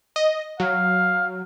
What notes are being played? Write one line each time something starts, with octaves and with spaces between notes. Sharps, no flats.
D#5
F#3 F5